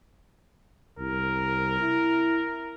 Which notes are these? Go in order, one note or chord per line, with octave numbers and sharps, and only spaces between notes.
C2 A#4
E4